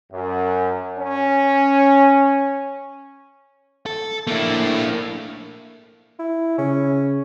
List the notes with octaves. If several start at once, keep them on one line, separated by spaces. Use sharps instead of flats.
F#2
C#4
A4
A3 A#3 D4 E4
E4
C#3 C#4